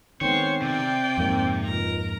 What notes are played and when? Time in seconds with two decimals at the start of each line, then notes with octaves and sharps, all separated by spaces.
0.21 D#3 G#3 B3 C4 C5 C#5
0.62 C3 D5 G5
1.18 F2 G#2 A#3
1.65 C#2 A#4 A#5